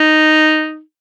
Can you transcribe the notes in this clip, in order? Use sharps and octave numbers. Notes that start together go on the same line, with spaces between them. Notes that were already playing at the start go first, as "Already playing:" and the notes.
Already playing: D#4